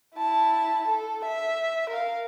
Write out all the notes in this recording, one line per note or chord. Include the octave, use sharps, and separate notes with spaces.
E4 A5
A4
E5
A#4 F5